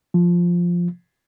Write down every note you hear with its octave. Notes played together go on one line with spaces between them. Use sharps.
F3